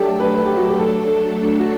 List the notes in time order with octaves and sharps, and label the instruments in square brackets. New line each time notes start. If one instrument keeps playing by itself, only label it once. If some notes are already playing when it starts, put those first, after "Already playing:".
Already playing: [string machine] F#3 A3 D4 A4 [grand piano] G4
[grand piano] B4
B4
G4
F#4
G4
A4
F#4